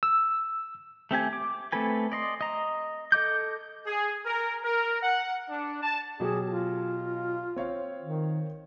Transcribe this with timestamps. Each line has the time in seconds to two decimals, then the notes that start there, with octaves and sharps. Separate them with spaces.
0.03 E6
1.11 A3 C4 G4 G#5
1.33 D6
1.72 A3 C4 A4 B4 G#5
2.12 D5 D#5 C6
2.41 D#5 A#5
3.12 A4 D#5 D6 G6
3.86 G#4
4.25 A#4
4.64 A#4
5.02 F#5
5.49 D4
5.82 A5
6.20 B2 F#3 G4 G#4
6.45 F4
7.56 C4 C#5 F5
8.01 D#3